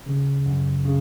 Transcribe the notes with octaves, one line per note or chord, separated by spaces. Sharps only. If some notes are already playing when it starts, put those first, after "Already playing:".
C#3
F#2
C#3